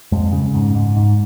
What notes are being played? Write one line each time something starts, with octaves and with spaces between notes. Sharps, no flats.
F2 G#3
C#3
G#2
G#2
G#2